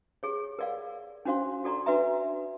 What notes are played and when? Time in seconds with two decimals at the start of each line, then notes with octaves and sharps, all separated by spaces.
0.23 G4 G#4 C#5
0.59 A#4 D5 F5
1.25 C#4 D4 F#4 C5 F5 C6
1.64 F#4 A4 D5 A#5 C6
1.86 D4 F#4 B4 D5 E5 A#5